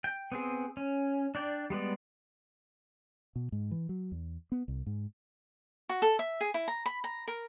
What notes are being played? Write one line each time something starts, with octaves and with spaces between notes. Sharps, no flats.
G5
B3 C4 G#4
C#4
D4 D5 G5
G3 G#3 B3 D5
B2
G#2
E3
F#3
E2
B3
C2
G#2
F#4
A4
E5
G#4
E4
A#5
B5
A#5
A#4